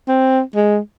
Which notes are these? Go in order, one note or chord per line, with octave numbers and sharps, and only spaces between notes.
C4
G#3